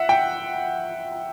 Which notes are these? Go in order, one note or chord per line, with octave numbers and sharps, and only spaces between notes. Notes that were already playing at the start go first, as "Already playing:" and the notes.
Already playing: E5 F#5
G5